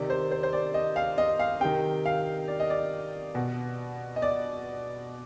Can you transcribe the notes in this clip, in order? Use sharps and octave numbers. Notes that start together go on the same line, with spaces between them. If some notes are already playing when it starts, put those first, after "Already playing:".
Already playing: C3 D#3 D5
C5
C5
C5
D5
D#5
F5
D#5
F5
C3 D#3 G5
F5
D5
D#5
D5
B2
D#5
D5